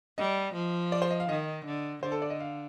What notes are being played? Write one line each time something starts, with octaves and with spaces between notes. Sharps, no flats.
G3 D#5
F3
D5
C5
D#5
F5
D#3 D#5
D3
D3 C5
A4
D5
D#5
F5